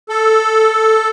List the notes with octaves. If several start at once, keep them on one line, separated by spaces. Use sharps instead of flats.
A4